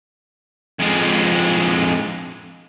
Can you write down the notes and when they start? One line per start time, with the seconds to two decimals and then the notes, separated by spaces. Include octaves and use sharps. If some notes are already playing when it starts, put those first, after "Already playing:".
0.79 F2 G#3